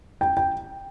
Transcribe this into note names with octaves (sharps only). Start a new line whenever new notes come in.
G5
G5